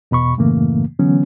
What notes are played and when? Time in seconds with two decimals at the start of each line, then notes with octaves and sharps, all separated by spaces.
0.11 E2 B2 B5 C#6
0.37 F#2 A2 C#3 E3 A3 A#3
0.99 D3 E3 F#3 B3 C#4